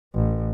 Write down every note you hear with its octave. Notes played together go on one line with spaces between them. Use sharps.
A1